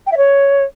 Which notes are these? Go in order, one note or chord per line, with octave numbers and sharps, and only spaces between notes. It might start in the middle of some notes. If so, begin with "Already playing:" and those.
G5
E5
C#5